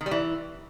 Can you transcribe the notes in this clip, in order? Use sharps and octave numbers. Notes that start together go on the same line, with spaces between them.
D#3
G3
E3